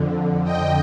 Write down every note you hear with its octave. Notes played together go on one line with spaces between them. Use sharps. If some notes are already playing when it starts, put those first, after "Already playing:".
Already playing: F2 D3
D#5 G5